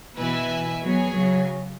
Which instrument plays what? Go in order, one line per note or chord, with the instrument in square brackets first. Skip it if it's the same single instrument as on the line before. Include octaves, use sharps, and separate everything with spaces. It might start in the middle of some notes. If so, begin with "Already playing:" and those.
[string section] B2 E3 [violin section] E4 B4 E5 G#5
[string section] F#3 B3 [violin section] G#4 C#5 G#5
[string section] C#3 F#3